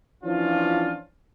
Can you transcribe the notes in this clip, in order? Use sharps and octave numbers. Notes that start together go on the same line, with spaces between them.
E3 F3 C#4 D4 F4